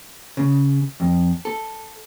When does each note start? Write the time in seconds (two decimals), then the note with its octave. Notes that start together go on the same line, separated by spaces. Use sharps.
0.37 C#3
1.00 F2
1.45 A4